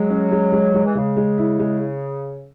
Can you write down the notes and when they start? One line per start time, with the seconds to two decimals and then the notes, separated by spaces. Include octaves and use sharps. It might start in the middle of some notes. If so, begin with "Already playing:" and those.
Already playing: F#3 G#3
0.10 C#4
0.32 G#3
0.52 G#3
0.75 G#3
0.84 E3
0.95 C#3 G#3
1.17 G#3
1.38 E4
1.59 G#3